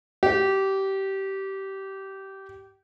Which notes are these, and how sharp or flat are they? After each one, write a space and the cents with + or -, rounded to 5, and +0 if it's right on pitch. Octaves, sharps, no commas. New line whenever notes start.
G4 -20